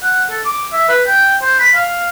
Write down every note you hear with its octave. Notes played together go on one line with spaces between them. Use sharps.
F#5
A4
D6
E5
B4
G5
C5
B5
F5